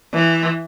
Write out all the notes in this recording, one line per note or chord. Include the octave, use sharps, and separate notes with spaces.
E3